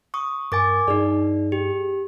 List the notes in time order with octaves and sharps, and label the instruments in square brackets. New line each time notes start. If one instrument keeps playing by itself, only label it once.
[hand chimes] C#6 D#6
[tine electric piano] G2 A#4 A6 [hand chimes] G#5 D6
[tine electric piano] G2 G#4 [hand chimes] D#4 D5
[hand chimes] G4